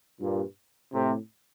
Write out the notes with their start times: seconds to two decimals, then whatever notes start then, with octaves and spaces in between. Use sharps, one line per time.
0.21 G2 A#2
0.92 A2 C3